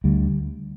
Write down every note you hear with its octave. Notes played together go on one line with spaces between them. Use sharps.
D2 G3